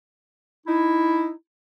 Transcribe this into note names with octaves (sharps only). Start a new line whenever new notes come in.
D#4 E4